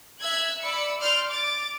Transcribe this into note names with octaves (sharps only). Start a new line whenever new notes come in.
E5 E6 F#6 G#6
D5 B5 E6 C#7
D5 C6 F6 G6
D6 A6